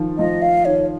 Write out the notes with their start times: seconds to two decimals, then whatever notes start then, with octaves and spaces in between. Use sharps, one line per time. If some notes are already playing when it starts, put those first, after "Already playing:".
Already playing: D#3 F3
0.18 F3 D#5
0.42 F5
0.65 D#3 C#5